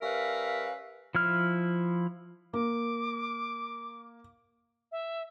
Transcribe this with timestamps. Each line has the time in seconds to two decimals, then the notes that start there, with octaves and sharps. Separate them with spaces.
0.02 G3 C#4 A#4 B4 E5 F5
1.15 F3 E4 F6
2.53 A#3 D6
4.92 E5